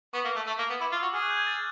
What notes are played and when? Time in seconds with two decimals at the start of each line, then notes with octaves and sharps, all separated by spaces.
0.14 B3 C#6
0.25 A#3
0.36 A3
0.47 A3 C#6
0.58 A#3
0.70 B3
0.80 E4 D6
0.92 F4
0.97 E6
1.02 F#4
1.13 G#4 F6
1.23 F#6
1.30 G6
1.38 G#6
1.47 A6